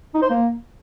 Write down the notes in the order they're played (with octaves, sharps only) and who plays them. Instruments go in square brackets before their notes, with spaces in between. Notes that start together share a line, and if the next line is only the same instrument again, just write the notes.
[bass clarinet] D#4
C5
A#3